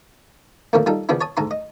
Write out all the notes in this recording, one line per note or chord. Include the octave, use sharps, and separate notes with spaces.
F2 A2 D3 F3 A3 A#3
G3 D#4 F4 A4
C#3 F3 B3 C#4 D4 E4
C#5 A5 D#6
D2 G#2 A4 A#5 C6
D#5